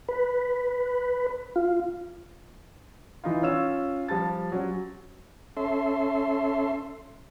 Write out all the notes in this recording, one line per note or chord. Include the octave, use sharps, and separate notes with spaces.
B4
F4
E3 D#4 F4
C#4 F4 E6 E7
F3 G3 A5 A6
F#3 C#4
C#4 A4 E5 C6